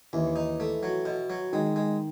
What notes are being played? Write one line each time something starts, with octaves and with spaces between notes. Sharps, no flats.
D#2 E3
D#4
A3
F#3
B2
F#3
D#3 G#3
G#3